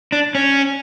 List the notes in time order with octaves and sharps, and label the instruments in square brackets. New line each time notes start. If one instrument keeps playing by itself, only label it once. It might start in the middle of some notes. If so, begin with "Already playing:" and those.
[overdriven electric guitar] D4
C#4